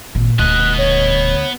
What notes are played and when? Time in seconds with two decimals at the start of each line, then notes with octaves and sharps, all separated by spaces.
0.15 G#1 A#2
0.39 D#1 D2 B3 D#5 F#6
0.78 C#5